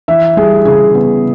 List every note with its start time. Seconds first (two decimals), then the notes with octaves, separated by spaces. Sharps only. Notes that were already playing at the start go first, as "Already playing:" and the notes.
0.08 E3 E5
0.37 G3 G#4
0.65 C#3 G#4
0.95 B3